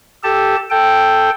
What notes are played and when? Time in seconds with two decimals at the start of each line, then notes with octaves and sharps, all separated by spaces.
0.23 G4 A4 A5
0.70 A4 G5